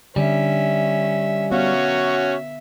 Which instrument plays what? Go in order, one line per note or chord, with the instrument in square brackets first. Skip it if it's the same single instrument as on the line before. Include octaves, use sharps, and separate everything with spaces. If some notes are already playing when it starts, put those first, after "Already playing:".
[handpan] D3 [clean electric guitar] G3 [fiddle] C#4 E5
[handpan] B3 F5 [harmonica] C#4 F#4 [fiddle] E5